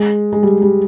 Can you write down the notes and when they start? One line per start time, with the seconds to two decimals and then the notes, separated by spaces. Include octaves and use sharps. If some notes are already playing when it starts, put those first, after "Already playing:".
Already playing: G#3
0.33 G#3
0.43 G3
0.62 G3